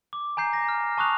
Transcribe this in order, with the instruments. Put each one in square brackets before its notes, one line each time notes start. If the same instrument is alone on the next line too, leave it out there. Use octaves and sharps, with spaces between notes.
[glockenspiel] D6
G#5 A#5 G6 C7
A#6
F6
A5 C#6 D#6 F#6 F7